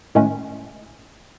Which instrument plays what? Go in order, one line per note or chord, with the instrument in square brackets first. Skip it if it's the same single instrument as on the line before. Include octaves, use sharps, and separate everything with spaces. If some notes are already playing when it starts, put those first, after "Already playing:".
[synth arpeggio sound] A2 D#3 G#3 A3 C#4